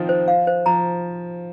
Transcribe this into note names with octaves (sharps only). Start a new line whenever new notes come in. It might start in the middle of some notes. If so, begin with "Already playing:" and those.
Already playing: D#3 F3 C4 D#4 F4
C5
F5
C5
F3 A#5